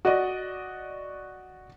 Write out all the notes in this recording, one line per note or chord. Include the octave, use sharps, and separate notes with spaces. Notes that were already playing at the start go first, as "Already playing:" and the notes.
F#4 D5 D#5